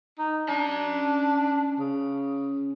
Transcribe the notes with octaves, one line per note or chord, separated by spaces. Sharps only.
D#4
C#4 D4 A#5
C#3